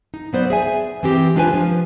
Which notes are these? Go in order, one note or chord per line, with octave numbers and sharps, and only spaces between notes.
D#4
F#3 B3 C5 D5
G#4 E5 G#5
E3 C4 G4
G#3 D4 F4 B4 C5 G#5
F3